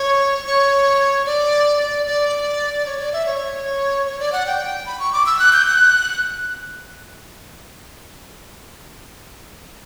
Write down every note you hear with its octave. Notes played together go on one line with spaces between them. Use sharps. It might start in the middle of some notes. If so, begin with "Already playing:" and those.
Already playing: C#5
C#5
D5
D5
C#5
D5
E5
C#5
C#5
D5
F#5
G5
B5
C#6
D6
E6
F#6
G6
F#6